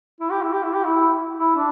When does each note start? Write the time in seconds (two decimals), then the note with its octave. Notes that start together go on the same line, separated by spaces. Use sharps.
0.20 E4
0.30 G4
0.42 E4
0.53 G4
0.63 E4
0.74 G4
0.84 E4
1.39 E4
1.56 D4